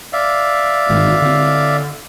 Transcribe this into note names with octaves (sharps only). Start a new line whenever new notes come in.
D5 E5 F5
G1 G#2 D#3
D3 C4